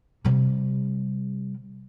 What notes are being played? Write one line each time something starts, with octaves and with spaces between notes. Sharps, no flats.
C3 G3